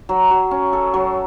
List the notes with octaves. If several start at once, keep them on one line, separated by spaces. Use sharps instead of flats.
F#3
F#3
C#4
A4
F#3